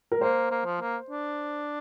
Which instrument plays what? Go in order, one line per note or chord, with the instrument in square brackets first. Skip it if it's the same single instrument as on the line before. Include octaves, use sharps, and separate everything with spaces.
[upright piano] A#4
[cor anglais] A#3 [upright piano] C5
[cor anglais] A#3
F3
A#3
D4